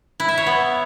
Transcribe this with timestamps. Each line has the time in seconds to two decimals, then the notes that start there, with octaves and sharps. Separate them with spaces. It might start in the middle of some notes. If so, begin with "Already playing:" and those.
0.20 E4
0.29 E5
0.38 C#5
0.47 B3